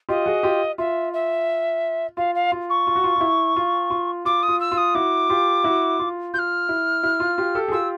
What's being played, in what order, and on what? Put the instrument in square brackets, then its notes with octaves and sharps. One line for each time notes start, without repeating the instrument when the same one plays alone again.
[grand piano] F4 G4 [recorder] D#5
[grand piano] F#4 G#4
F4 G4
[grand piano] F4 [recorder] E5
[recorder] E5
[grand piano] F4 [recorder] F5
[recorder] F5
[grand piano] F4
[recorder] C#6
[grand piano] F4
F#4
F4
F4
E4
F4
F4
[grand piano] F4 [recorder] D6
[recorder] D#6
[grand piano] F4
[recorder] E6
[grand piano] F4
[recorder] D#6
[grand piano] E4 F#4 [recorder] D6
[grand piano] F4 G4
E4 F#4
F4
[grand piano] F4 [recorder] F6 G6
[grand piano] E4
E4
F4
F4 G4
G4 A4
G#4
[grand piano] F4 G4 [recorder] E6